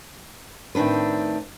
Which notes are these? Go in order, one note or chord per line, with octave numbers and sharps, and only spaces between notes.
A2 D#3 C4 D4 B4